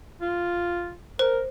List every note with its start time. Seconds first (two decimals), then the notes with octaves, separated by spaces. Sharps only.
0.21 F4
1.19 A#4 C5